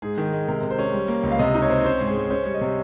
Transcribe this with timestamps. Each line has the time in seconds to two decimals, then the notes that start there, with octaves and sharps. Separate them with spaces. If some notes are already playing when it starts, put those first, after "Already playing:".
0.02 G#2 G#4
0.18 D#3
0.24 G#4
0.32 G#3
0.48 C3 A#4
0.63 C3
0.70 C5
0.79 C#4
0.93 G3
1.08 A#3
1.23 C#2
1.31 F5
1.39 C3 D#5
1.54 D#4
1.62 C#5
1.70 C4
1.84 C#4 C5
2.00 G#2
2.07 G#4
2.15 G#2
2.30 C#4 C5
2.43 G3 C#5
2.54 D#5
2.61 C3